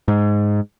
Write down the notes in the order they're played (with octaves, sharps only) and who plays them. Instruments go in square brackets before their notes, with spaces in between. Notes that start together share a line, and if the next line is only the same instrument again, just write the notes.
[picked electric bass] G#2